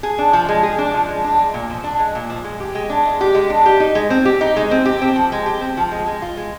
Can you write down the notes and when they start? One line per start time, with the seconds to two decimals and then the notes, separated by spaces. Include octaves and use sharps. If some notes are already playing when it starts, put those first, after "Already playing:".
0.03 G#4
0.18 D4
0.33 F3
0.49 G#3
0.63 G#4
0.78 D4
0.94 F3
1.09 G#3
1.24 D4
1.39 G#3
1.54 A#2
1.70 F3
1.84 D4
1.99 G#3
2.15 A#2
2.30 F3
2.44 G#3
2.60 G4
2.75 G#3
2.90 D4
3.05 G#3
3.21 G4
3.35 G#3
3.50 D4
3.66 G4
3.80 D#4
3.95 G#3
4.10 C4
4.25 G4
4.41 D#4
4.56 G#3
4.71 C4
4.85 G4
5.02 C4
5.16 F3
5.32 G#3
5.46 G4
5.61 C4
5.77 F3
5.92 G#3
6.06 G#3
6.22 F4
6.37 G#3